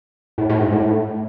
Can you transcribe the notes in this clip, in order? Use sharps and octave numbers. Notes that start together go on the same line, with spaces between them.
A2
A2
G#2
A2